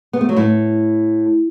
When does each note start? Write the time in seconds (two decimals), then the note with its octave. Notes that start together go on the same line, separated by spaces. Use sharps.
0.13 B3
0.21 A3
0.29 F#3
0.36 A2 A3